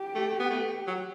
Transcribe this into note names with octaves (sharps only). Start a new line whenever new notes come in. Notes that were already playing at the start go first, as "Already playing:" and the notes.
Already playing: G4
A3
B3
A3
F#3